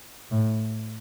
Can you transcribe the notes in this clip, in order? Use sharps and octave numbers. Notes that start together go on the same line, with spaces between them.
A2